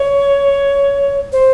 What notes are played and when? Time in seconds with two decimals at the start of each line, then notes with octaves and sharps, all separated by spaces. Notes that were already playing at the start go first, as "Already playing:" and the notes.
Already playing: C#5
1.32 C5